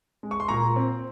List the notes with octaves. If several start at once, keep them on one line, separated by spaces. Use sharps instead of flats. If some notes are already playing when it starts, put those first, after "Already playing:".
G#3
C#6
C6
A#2 A#5 C#6
C4